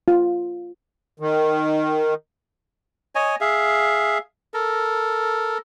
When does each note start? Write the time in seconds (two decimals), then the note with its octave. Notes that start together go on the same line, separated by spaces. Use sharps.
0.08 F4
1.20 D#3
3.15 C#5 D#5 G#5
3.41 G#4 E5 F5
4.54 A4 A#4